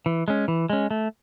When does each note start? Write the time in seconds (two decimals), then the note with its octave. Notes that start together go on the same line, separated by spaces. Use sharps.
0.06 E3
0.28 G#3 C#4
0.48 E3
0.70 G#3 C#4
0.91 A3